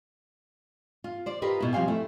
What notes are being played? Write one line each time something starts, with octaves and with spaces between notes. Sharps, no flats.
F4
C5 D5
F4 G4 A#4 B4 D#5
B2 E4
F3 G3 C4 F5 G5 G#5
A3 E4 E5